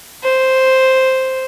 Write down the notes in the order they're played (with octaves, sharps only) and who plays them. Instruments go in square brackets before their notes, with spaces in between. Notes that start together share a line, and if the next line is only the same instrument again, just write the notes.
[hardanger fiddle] C5